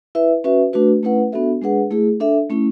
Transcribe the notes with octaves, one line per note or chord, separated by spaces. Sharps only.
E4 B4 E5
C#4 F#4 B4 E5
A3 D4 F#4 B4
A3 C#4 E4 B4 F#5
B3 D4 F#4 A4 E5
G#3 D4 G#4 B4 F#5
A3 E4 G#4
D4 A4 E5
A3 C#4 E4